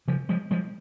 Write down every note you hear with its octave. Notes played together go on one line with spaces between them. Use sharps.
C#3 F3
F3 G#3
F3 G#3